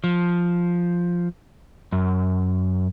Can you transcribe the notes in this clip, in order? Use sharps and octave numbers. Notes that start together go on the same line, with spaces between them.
F3
F#2